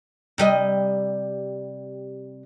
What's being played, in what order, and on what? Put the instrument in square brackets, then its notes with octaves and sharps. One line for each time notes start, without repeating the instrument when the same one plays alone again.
[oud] C3 G3 D#5